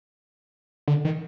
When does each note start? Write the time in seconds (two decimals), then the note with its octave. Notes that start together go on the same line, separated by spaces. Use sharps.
0.88 D3
1.05 D#3